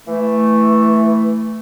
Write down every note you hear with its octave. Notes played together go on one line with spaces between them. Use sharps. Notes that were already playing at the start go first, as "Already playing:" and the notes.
E3 A3